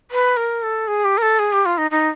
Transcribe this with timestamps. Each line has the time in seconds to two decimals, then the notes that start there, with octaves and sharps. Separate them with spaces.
0.11 B4
0.37 A#4
0.63 A4
0.87 G#4
1.04 G4
1.18 A#4
1.22 A4
1.39 G#4
1.53 G4
1.65 F4
1.78 D#4
1.91 D#4